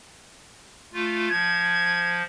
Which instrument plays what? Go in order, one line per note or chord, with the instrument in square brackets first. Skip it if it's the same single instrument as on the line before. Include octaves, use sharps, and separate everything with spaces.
[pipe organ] A3 F4
[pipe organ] F3 [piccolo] G#6